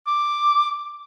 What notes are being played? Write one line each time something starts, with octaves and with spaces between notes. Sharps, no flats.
D6